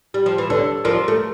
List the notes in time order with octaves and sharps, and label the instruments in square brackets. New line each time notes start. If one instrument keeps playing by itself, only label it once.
[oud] G3
F3
E3
[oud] D3 [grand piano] A4 C#5
[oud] F3 [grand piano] A#4 D5
[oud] A3